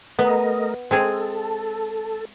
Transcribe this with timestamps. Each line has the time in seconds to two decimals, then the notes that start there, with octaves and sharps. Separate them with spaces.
0.19 A3 B3 A#4 D#5
0.91 G#3 C4 G#4 A4